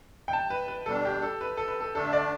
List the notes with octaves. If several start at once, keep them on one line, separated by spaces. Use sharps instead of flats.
G5
A5
B4
B4
B2 G3 D4 A4
G4
A4
B4
A4
B4
A4
D3 A3 D4 A4
E5
D5